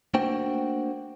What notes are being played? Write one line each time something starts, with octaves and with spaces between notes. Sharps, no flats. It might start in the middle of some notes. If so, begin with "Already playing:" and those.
A3 A#3 D4 F#4 C5 G5